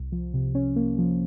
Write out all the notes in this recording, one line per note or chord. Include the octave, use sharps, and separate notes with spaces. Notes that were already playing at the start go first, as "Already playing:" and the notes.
Already playing: C2
F3
C3
C#4
A#3
F3